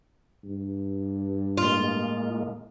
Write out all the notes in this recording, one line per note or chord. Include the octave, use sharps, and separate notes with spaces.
G2
A2 G#3 A#3 F4